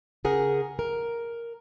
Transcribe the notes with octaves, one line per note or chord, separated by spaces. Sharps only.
C#3 G#4 A#4 F#5
A#4